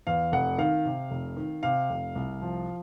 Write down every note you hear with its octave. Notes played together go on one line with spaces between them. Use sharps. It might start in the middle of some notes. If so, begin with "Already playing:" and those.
E2 F5
F1 F#5
D#3 F5
C3
F1
D#3
C3 F5
F1
C2
F3